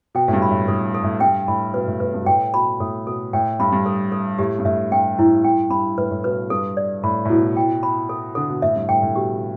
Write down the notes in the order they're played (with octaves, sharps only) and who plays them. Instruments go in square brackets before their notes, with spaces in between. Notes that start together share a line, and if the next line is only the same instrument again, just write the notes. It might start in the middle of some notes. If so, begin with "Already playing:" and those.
[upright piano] B2 [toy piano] G5
[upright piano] A2
G2
[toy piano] B5
[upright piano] A2
[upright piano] A2 [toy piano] A4
[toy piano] A4
[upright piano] A2
[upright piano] G2 [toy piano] G5
[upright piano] A2 [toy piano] B5
[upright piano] B2 [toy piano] B4
[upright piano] A2
[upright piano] A2 [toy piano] B4
[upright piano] G2
B2
[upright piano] A2 [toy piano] G5
[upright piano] B2 [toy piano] B5
[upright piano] A2 [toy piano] A4
[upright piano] B2 [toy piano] A4
[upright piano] A2 [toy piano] G5
[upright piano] G2 [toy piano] B5
[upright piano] G2
[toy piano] A4
A4
[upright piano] A2 [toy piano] G4
[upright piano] G2
[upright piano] A2 [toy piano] E5
[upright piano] G2 [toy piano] G5
[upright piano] A2 [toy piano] E4
[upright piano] G2 [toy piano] G5
[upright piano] G2 [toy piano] B5
[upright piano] A2 [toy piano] B4
[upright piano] A2
[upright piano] B2 [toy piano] B4
[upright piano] G2 [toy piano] A4
[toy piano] D5
[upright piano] A2 [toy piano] B5
[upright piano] A2
[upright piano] B2 [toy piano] E4
[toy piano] G5
B5
A4
[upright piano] D3 [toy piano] A4
[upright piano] B2
[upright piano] A2 [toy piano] E5
[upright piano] G2
[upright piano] A2 [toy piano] G5
[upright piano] A2
[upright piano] B2 [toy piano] G4